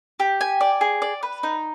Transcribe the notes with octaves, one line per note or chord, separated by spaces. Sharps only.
G4
G#5
D5
G#4
D5
B4
D#4